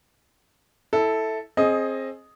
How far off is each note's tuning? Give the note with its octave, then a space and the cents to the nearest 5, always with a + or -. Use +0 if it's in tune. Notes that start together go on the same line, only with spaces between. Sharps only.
E4 -15 A4 +0
C4 +25 G#4 +15 D#5 +0